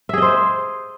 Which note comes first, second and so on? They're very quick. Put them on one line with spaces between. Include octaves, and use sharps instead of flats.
E5 G#4 D#5 C5